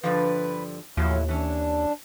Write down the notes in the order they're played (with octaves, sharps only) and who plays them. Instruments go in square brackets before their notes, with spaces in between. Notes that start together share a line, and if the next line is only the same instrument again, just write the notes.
[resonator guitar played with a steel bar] G2 D3 F3 [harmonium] B4
[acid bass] D#2 [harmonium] A2 E4 [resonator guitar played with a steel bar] F3 F#3
[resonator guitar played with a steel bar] E3 C#4 [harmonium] D4